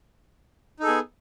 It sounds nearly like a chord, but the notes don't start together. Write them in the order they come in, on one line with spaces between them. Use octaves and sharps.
D#4 A4 G#4 B3